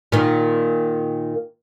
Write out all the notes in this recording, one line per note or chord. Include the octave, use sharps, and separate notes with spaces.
A#2 D#3